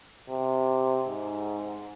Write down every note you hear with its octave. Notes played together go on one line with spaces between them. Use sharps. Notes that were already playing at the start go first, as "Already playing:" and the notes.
C3
G#2